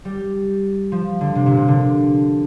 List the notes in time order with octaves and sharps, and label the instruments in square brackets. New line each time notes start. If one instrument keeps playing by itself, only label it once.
[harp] G3
F3
D3
C3
A#2
C3
D3